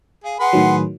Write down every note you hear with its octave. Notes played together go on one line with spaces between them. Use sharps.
G#4 F5
G#4 B4 F#5 C6
A2 D#3 F#3